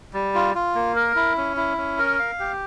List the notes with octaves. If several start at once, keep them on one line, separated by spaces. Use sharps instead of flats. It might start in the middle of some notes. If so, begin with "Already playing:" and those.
G3
F4
F4
A#3
A#4
E4
C#4
E4
C#4
A#4
F5
G4